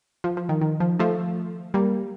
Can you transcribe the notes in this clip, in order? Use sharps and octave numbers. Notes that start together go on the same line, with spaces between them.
F3
F3
D#3
D#3
F3
F3 A3
G3 A#3